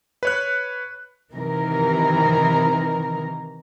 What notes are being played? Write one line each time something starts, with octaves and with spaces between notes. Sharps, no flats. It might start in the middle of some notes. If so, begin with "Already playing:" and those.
B4 C#5 F#6
C3 D#3 E3 A#4